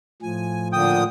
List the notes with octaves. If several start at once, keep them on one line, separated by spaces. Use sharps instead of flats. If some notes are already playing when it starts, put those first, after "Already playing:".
A2 F3 G#5
A#2 D3 G5 D#6